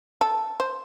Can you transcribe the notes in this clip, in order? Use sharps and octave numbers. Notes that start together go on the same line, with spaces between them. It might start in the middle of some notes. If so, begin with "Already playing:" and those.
A4
C5